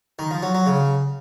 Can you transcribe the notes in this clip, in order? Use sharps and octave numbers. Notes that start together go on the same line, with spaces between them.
D#3
F3
F#3
F#3
C#3